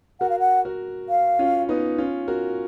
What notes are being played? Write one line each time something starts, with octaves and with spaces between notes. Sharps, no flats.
F#4 A#4 F#5
F5
F#5
F#4 A#4
F5
C#4 F4
B3 D#4
C#4 F4
F#4 A#4